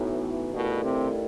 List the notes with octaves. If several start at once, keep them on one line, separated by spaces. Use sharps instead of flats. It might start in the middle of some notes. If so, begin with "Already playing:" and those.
Already playing: A2 E3 B3 D#4 F#4
G2 B2 D#3 A3 E4 A4
C3